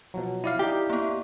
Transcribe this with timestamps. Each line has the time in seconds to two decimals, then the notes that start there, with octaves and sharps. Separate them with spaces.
0.14 B2 F3 F#3
0.44 E4 D5 F5
0.59 D#4 G4 G5
0.90 A#3 B3 A#5